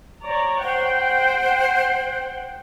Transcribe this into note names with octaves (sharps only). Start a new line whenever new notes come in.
C#5 D5 A#5
C5 F#5 G5